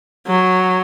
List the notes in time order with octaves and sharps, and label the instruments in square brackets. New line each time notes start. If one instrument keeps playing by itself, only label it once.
[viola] F#3